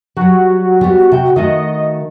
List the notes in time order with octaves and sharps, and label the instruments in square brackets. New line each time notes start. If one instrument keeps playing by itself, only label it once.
[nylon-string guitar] F#3 G3 [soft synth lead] F#4
[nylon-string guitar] G3 B3
C3 G5
[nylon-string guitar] D#3 A3 F#4 [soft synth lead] D#5